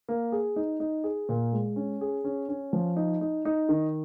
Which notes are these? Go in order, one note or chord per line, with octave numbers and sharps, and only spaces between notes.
A#3
G#4
D#4
D#4
G#4
A#2
G#3
C#4
G#4
C#4
C#4
F3
D#4
D#4
D#4
D#3